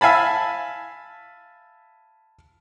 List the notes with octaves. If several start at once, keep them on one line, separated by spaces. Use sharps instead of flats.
E5 F5 G#5 A5 B5